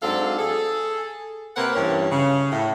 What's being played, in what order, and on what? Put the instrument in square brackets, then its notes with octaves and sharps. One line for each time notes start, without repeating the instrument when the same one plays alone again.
[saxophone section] G#2 F#3 C4 D4 A4 F5
G#4 A4
C3 A#3 C4 A#4 B4 F#5
G2 E3 C#4
C#3
A2